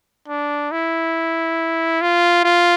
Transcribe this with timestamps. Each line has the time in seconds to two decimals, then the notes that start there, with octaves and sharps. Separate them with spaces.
0.28 D4
0.72 E4
2.02 F4
2.44 F4